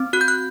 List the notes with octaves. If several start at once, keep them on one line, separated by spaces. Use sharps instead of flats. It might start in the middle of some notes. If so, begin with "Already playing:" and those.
Already playing: C4
F#4 F#6
G6
F#6